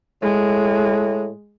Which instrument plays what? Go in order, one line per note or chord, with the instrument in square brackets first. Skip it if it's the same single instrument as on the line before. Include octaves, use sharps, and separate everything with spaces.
[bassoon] A2 [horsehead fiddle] G#3